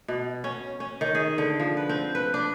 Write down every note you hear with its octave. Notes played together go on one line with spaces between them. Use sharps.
B2
C#4
C#4
D#3
G#4
D3
F3
B4
C4
B4
D4